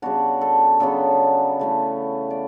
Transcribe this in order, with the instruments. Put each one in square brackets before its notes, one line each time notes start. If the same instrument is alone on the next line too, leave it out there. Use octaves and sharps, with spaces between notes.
[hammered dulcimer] C#3 G3 B3 D4 F#4
A4
C#3 F#3 B3 D4 A4
C#3 E3 A3 C#4
D5